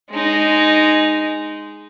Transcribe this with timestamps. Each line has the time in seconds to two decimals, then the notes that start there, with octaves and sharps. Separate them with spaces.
0.11 G#3 D#4